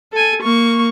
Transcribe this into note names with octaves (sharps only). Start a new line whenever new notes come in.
A4 G#5
A#3 C#6